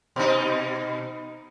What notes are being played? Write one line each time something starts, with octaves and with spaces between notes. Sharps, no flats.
B2 D#4